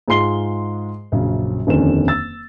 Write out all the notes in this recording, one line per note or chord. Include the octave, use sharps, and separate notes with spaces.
G#2 G#3 F4 C6 C7 G7
A#1 F#2 C#3
D#1 F2 D3 D#3 C#4 E7
E6 A6